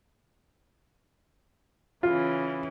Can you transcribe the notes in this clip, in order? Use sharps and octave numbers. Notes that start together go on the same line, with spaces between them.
C#3 E3 F4